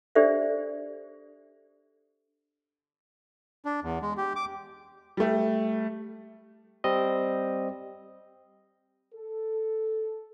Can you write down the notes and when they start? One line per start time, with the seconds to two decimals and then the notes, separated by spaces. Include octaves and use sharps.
0.15 D4 G4 A4 C5 D5 E5
3.65 D4
3.84 E2
4.02 G#3
4.17 G4
4.36 D6
5.17 G3 A3
6.84 G3 C4 D#5
9.14 A4